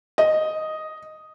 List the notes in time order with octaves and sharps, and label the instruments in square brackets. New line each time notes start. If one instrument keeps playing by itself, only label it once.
[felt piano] D#5